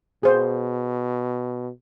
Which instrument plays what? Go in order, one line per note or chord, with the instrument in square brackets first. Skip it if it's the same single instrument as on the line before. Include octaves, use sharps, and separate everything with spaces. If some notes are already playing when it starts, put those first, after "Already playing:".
[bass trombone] B2 [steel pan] G#4 C5